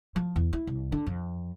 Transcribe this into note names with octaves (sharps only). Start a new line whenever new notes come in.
F3
E2
E4
C2
D3
F2